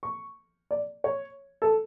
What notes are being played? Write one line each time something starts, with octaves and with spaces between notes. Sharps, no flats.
C#6
D5
C#5
A4